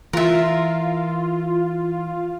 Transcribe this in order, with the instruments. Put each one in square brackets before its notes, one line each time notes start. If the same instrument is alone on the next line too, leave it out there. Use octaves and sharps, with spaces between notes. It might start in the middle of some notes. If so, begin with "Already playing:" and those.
[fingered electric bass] E3 [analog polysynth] F4 [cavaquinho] A#4 E5